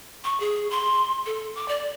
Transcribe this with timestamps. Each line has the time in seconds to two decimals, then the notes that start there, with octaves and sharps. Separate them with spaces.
0.24 C#6
0.40 G#4
0.71 C6
1.26 A4
1.55 D6
1.68 D5